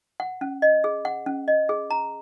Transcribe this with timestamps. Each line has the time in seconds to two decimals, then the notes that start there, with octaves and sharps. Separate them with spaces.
0.20 F#5
0.41 C#4
0.62 D#5
0.84 G#4
1.05 F#5
1.26 C#4
1.48 D#5
1.69 G#4
1.91 A#5